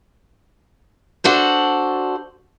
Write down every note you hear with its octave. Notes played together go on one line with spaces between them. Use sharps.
D4 F#4 A4 C5